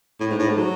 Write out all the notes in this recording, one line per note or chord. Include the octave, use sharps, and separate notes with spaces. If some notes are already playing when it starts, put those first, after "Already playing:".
A2
G#2
A2
G#2
F#3